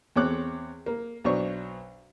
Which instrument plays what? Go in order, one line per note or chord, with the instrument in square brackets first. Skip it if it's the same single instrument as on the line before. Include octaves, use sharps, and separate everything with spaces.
[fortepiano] E2 C4 C#5 D6 F#6
A#3
B1 F#3 D4 C5 C#6